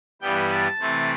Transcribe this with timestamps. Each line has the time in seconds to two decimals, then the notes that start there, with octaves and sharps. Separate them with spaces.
0.22 G2 E3 G3 B3 G5
0.51 A5
0.79 C3 E3 A3 C4